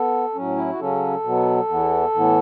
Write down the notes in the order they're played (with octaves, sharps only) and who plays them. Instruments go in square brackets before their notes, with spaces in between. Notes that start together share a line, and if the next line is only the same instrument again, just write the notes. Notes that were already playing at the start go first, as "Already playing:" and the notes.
Already playing: [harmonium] B3 A4
A2 F#3 C#4
E4
F#4
C#3 F#3 C#4 A4
B2 F#3 B3
E2 E3 B3
A2 E3 B3